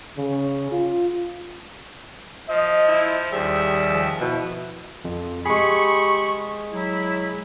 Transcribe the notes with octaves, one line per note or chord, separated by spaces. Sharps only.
C#3
F4
F3 C5 D#5
E4
D#2 G3 G#4 E5
F3
B2 E4
F2
G#3 G4 G#4 B5 C#6
F#3 E4